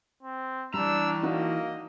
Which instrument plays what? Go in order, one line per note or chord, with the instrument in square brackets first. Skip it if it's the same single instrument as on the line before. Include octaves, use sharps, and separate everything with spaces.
[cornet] C4
[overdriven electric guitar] E3 A#5 [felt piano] G3 [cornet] D4 [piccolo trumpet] E6
[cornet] A#3 [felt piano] D#4 F#4 [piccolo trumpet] D#5